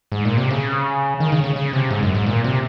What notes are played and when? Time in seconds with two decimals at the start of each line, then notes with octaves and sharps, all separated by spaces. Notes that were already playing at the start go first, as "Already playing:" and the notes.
0.12 G#2
0.25 A#2
0.37 C3
0.51 C#3
1.20 D#3
1.32 C#3
1.44 C#3
1.56 C#3
1.73 C3
1.91 G#2
2.03 F#2
2.15 G#2
2.27 A#2
2.44 C3